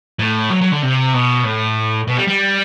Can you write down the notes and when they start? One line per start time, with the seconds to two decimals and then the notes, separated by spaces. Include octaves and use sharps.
0.19 A2
0.50 F#3
0.61 F#3
0.72 D3
0.82 C3
1.14 B2
1.44 A2
2.08 B2
2.17 G3
2.28 G3